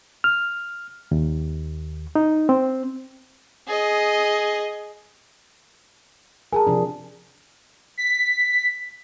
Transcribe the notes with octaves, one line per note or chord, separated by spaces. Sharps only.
F6
D#2
D#4
C4
G#4 D#5
G#4 A#4 G#5 A5
C3 F3 D4
B6